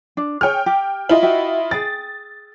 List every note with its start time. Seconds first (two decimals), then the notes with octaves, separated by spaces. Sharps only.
0.17 D4
0.41 G#4 C#5 G5 F6
0.66 G4
1.09 E4 F4 D#5
1.22 F#4 E5 G5
1.71 G#4 G5 A6